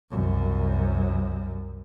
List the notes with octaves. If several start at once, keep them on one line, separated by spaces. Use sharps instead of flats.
C2 F#2